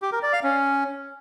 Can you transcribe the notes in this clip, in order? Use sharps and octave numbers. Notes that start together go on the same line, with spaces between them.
G4
A#4
D5
F5
C#4